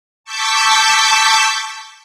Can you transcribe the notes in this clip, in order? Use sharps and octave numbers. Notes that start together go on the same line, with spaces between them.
A5 C#6 D6 E6 G6 B6